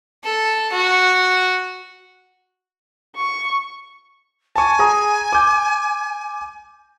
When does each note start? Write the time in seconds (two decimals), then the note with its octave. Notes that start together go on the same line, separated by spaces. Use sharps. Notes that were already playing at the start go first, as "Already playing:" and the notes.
0.24 A4
0.72 F#4
3.16 C#6
4.56 G#5 A5 C#6
4.79 G#4 A#5 D#6
5.33 D6 G6